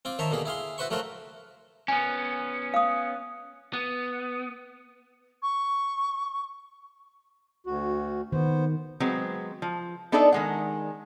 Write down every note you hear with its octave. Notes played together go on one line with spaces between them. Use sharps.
C4 F4 D6
D#3 C5 C#5 E5 A5 A#5
B2 D3 A#3 G4 G#4
E4 G#4 F5 C6
E4 F#4 B4 C5 C6 C#6
F#3 A3 F4 F#4 A#4 C5
B3 C#4 G#5
F5 D#6
B3
C#6
D2 F#4
D#3 B3 C5
F#3 G#3 B3 C4
F3
B3 D4 D#4 A4 D5 E5
D#3 G#3 F#5